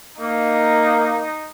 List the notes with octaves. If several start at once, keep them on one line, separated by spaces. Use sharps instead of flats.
A#3 D#4